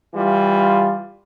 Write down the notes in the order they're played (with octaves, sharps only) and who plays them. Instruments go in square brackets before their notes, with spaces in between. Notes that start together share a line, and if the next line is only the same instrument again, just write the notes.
[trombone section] E3 G3 F4